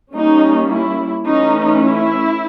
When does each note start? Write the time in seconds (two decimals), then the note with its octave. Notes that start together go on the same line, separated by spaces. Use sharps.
0.14 G3 A#3 C#4 D#4
0.70 E4
1.27 E3 A3 C#4 D#4
1.83 E4